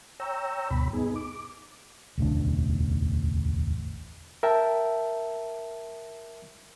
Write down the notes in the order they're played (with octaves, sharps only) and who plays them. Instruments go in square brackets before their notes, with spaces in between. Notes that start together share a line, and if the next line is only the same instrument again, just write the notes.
[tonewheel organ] C#5 G5 A#5 E6
D2 G2 B2 B5
B3 D#4 G#4
D6
[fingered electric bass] E1 A1 D2 D4
[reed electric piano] A#4 E5 G5 A5